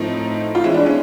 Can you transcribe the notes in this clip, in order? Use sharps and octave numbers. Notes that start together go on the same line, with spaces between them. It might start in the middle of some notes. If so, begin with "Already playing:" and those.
Already playing: A2 F3 A3 C4 D#4
F4
E3 G#3 C#4 E4
D4
C#4